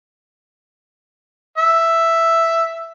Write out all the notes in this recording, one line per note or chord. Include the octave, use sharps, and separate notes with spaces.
E5